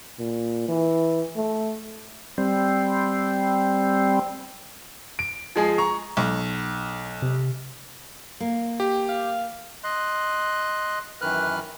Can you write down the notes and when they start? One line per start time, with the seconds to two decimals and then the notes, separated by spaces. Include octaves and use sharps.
0.19 A#2
0.68 E3
1.36 A3
2.38 G3 C4
5.19 D7
5.56 F3 G#3 G#4
5.78 A#5 C#6
6.17 B1
7.22 C3
8.40 A#3
8.80 G4
9.09 F5
9.84 D#5 C6 F#6
11.21 F#2 D#3 E3 B4 F6 F#6